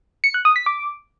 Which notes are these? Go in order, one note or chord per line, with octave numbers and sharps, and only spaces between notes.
C#7
F#6
D#6
B6
D6